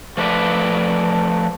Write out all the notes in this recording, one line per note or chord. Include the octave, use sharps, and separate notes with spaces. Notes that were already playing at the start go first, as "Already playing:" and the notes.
F3 A3 B4 D5